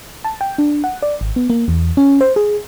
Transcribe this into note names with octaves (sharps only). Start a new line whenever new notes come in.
A5
G5
D4
F#5
D5
G#1
B3
A#3
E2
C#4
C5
G#4